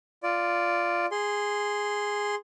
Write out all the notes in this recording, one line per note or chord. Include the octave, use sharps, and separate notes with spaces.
F4 D5
G#4 C6